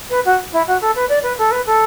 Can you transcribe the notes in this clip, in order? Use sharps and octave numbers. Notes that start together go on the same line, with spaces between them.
B4
F#4
E4
F#4
A4
B4
D5
B4
A4
B4
A4